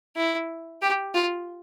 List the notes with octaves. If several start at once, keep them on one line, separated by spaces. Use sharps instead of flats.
E4
G4
F4